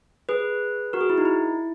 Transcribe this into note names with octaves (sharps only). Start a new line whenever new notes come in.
G#4 B4
F#4 A#4
G#4
E4
D#4
E4